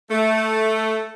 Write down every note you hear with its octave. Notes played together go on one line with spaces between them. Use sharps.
A3